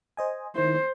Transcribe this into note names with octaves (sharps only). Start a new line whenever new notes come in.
C5 D#5 G#5
D#3 E4 C5